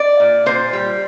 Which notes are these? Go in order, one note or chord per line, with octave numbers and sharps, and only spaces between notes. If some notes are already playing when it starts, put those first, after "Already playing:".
Already playing: D5
A#2
A#2 C5
G3